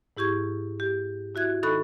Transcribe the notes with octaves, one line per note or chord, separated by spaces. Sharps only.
G#2 E4 G4 C#6 G#6
G4
E4 F#4 E5 F#6 G#6
D#3 D#4 A4 B5 C#6 F#6